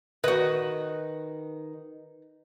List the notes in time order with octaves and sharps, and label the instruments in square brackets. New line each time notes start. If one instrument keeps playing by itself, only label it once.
[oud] D#3 F#4 [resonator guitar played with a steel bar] B4 D#5